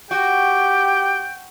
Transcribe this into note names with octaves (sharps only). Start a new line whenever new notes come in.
F#4 G4 G5